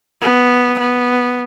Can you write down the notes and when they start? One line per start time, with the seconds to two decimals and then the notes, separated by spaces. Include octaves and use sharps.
0.22 B3
0.79 B3